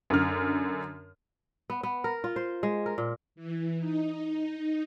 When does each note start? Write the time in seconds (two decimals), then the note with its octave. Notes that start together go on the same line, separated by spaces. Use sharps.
0.10 F#2 D3 F6
1.70 B3
1.83 B3
2.04 A#4
2.24 F4
2.36 C5
2.63 G#3
2.86 A#4
2.98 A#2
3.35 E3
3.78 D#4